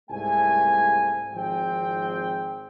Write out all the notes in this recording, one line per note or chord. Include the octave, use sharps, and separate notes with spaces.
C2 G#2 A3 G#5
G#1 F3 C4 G#4 G5